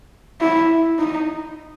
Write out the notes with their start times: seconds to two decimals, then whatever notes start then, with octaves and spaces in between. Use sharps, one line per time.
0.41 E4
0.98 D#4